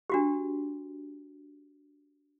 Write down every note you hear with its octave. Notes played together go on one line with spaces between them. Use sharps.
D4 F#4 G4